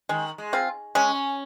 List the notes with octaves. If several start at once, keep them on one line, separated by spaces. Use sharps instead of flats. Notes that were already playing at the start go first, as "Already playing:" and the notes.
D#3 G#3
G#3
C4 F4
G#3 C#4